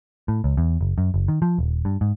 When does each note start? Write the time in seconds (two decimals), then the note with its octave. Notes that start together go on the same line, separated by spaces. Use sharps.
0.28 A2
0.44 C#2
0.57 E2
0.81 F#1
0.98 F#2
1.14 F#1
1.28 D#3
1.42 F3
1.58 D#1
1.85 G2
2.01 G#2